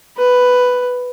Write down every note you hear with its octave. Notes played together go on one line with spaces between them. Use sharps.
B4